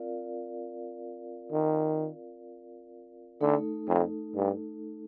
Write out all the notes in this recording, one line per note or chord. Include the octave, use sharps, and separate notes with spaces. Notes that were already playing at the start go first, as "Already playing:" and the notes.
Already playing: C4 F4 A#4 D5 F5
D#3
D3 A3 D#4 A4
F2
G2